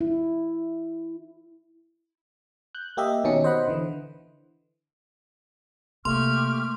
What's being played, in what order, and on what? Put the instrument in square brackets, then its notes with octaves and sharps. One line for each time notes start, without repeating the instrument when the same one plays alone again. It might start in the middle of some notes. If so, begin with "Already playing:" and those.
[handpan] E4
[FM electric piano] F#6 G6
A#3 G4 D#5 E5
B2 D#3 C#4 D#4 C#7
C5 D#5 F#5 B5
D3 E3
[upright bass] C3 [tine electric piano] A3 A#3 [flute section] G4 C#6 F6 [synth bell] C6